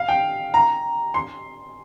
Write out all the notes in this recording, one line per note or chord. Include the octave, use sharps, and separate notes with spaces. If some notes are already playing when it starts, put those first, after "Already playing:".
Already playing: F5
G5
A#5
C6